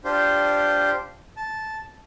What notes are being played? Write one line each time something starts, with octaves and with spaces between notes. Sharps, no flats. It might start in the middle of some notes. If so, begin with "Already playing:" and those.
D4 F4 G4 C5
A5